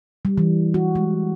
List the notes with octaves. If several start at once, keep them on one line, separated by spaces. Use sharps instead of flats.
G3
E3
F#4
G#3